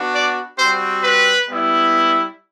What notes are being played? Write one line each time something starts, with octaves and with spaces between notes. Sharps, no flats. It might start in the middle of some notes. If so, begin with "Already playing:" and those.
Already playing: B3 D4 F#4
D5
G3 C4 F#4 C5
B4
G3 B3 E4